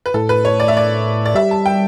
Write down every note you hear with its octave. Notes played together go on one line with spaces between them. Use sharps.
B4
A2 A4
B4
C#5
D5
E5
D5
D5
G3 E5
A5
G5